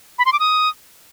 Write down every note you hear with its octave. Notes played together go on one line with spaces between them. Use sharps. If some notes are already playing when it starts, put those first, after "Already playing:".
B5
C6
D6
D#6